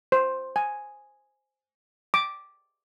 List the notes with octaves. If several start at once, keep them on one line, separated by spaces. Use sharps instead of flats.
C5
G#5
D6